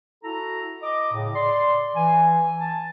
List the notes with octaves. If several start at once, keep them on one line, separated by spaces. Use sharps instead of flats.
E4 F#4 A4 A#5
D#5 D6
A2 C#3
D5 C6
E3 G#5
A5